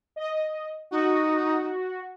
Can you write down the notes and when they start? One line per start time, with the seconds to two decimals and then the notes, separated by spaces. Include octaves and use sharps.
0.16 D#5
0.91 D#4 F#4